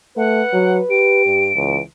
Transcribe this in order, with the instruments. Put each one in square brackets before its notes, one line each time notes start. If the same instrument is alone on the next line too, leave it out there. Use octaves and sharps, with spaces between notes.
[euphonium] A3 [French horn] B4 [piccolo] F#5
[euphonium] F#3
[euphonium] G4 [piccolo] D7
[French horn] G2
[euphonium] C#2 [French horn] E3